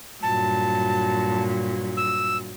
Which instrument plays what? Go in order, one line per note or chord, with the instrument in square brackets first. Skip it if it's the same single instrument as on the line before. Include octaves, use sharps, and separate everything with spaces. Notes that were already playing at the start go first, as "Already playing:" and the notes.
[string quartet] G2 A#2 F#3 [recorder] A5
[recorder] E6